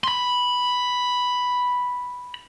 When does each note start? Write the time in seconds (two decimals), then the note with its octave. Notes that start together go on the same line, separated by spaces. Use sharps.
0.04 B5 C6